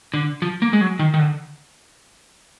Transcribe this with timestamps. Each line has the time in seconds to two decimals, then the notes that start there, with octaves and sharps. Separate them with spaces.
0.14 D3
0.42 F3
0.62 A#3
0.73 G#3
0.81 F#3
0.99 D#3
1.14 D#3
1.19 D3